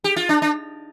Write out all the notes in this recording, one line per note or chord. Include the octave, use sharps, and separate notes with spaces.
G4
F4
D4
D4